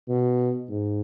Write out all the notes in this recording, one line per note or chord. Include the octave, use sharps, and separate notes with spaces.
B2
G#2